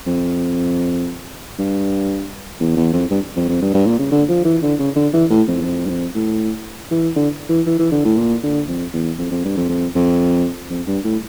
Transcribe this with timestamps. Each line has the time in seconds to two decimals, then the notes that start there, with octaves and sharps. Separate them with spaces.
0.07 F2
1.59 G2
2.60 E2
2.77 E2
2.93 F2
3.11 G2
3.36 F2
3.49 F2
3.62 G2
3.74 G2
3.87 A#2
3.99 C#3
4.12 D3
4.29 F3
4.45 E3
4.63 D3
4.79 C#3
4.96 D3
5.13 E3
5.30 A2
5.48 F2
5.60 E2
5.64 F2
5.85 G2
5.89 F2
6.15 A2
6.91 E3
7.16 D3
7.49 E3
7.67 E3
7.79 E3
7.92 D3
8.05 A2
8.18 A#2
8.43 D3
8.68 F2
8.94 E2
9.19 F2
9.31 F2
9.45 G2
9.57 F2
9.69 F2
9.95 F2
10.70 F2
10.87 G2
11.05 A2